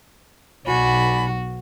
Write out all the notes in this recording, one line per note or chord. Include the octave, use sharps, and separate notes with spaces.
B1 F#4 D5 G#5 B5